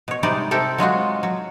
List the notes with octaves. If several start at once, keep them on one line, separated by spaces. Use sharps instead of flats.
B2 C#5
C3 G3 G#3 D#4 D5
C3 C4 G4 A4 A#4
F#3 G#3 F4 F#4
F#3